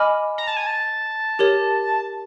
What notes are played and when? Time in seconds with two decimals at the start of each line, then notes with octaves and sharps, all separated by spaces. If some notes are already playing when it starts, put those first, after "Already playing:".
Already playing: D#5 G#5 B5 D6 F6
0.38 A#5
0.47 A5
0.57 G#5
0.67 A5
1.39 G4 A#4 C#5